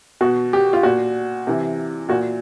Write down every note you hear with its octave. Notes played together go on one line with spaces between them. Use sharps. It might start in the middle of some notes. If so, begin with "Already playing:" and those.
B2 F#4
G4
F4
A#2 F#4
C3 E3
A#2 F#4